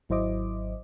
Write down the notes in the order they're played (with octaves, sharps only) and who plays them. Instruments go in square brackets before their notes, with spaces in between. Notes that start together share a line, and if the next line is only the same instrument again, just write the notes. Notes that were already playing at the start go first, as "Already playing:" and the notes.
[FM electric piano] G#1 F#3 E4 C5 D#5 D6